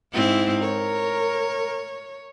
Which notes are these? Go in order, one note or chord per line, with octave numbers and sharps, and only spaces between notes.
G#2 C4 E4
A#4 C#5